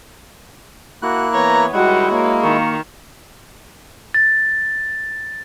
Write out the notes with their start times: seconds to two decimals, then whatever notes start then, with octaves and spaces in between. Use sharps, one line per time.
1.02 A#3 E4 F#4 F#6
1.33 E3 B3 C#5 A#5
1.73 F#2 D#3 G3 G#3 E4 F#4 F#5
2.10 A#3 C#5
2.43 D#3 C#6
4.14 A6